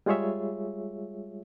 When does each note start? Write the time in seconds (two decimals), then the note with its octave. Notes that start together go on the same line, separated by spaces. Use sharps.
0.06 G3 G#3 F4 G#4 C#5 E5